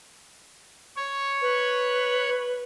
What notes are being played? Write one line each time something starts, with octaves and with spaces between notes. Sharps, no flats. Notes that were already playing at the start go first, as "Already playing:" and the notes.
C#5
B4